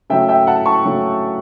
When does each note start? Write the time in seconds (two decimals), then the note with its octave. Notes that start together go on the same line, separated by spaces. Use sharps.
0.10 C#3 F#3 A3 E5 G5
0.28 E5 G5
0.47 F#5 A5
0.66 A5 C#6
0.85 C#3 F#3 A3